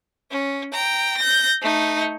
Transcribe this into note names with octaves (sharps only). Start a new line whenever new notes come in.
C#4
G5 A#5
G6 A#6
A3 D#4